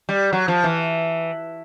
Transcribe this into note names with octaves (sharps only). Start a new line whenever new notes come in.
G3
F#3
F3
E3